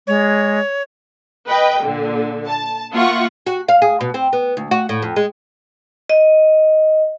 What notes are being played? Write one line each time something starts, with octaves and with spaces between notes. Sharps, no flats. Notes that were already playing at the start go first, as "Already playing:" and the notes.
G#3 C#5
B4 D#5 G5
A#2 D3
A5
A#3 F4 E5 F#5 C#6
F#4
F5
G#4
B2
C4
B3
D2
F#4
A2
F2
G#3
D#5